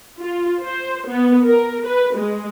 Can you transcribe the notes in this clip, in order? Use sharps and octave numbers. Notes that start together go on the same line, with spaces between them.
F4
C5
B3
A#4
B4
G#3